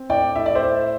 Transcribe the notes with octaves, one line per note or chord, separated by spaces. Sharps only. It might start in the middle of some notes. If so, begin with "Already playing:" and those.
Already playing: C4
A2 D5 G5
A2 E5
D5
C5 E5
A2